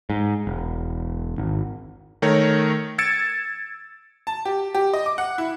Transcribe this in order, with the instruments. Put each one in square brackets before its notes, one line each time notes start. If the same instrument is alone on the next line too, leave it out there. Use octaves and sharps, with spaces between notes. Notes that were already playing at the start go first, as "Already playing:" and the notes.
[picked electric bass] G#2
E1
G#1
[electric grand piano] D#3 A3 A#4 C#5
E6 G#6 A6 C#7 D7 E7
[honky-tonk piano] A5
G4
G4
D#5
D6
F#5
E4